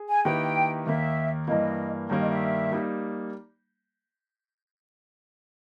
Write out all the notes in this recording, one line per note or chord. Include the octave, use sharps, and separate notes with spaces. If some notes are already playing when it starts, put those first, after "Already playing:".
Already playing: G#4
G#5
D#3 A#3 E4 G4 B4 G5
D#2 D#3 A#3 E5
G2 E3 A#3 D#5
G2 D#3 G3 A#3 C#5
D#5
E5
G3 A#3 D#4